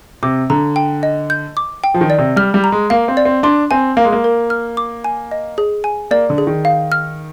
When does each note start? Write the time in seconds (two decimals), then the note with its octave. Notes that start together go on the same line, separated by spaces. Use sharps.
0.23 C3 D6
0.50 D3 A#5
0.76 G5
1.03 D#5
1.30 G6
1.57 D6
1.84 G5
1.94 F3
2.01 D#3
2.10 D5
2.19 C3
2.36 G3 F6
2.54 G3
2.64 A#5
2.72 G#3
2.90 A#3 F5
3.08 C4
3.17 D5
3.25 C4
3.43 D4 C6
3.71 C4 G#5
3.97 A#3 F5
4.05 G#3
4.12 A#3
4.24 A#4
4.50 F6
4.77 D6
5.04 G#5
5.31 D#5
5.58 G#4
5.84 G#5
6.11 A#3 D5
6.30 D3
6.38 G#4
6.47 D#3
6.65 F5
6.92 F6